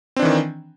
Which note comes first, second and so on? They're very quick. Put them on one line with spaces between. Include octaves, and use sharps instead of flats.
C4 D4 E3 D#3